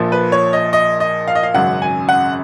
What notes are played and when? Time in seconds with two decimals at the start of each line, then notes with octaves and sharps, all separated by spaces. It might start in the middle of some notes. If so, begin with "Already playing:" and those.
Already playing: A#1 A#2 F3
0.12 B4
0.32 C#5
0.53 D#5
0.73 D#5
1.00 D#5
1.28 F5
1.35 D#5
1.43 F5
1.54 G#1 F#2 C#3 F#3 F#5
1.82 G#5
2.09 F#5